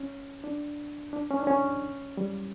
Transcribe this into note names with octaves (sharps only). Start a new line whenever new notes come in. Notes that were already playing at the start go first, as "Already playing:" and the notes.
Already playing: C#4
D4
D4
C#4
D4
C#4
G3